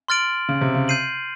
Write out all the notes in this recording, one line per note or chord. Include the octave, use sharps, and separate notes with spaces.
C6 F6 A6 D7 F#7
C#3
C3
C#3
G6 C7 D#7 F#7